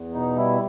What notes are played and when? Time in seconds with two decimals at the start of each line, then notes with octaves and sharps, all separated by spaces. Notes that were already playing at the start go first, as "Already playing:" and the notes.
Already playing: E2
0.14 B2 D#4
0.36 G3 E4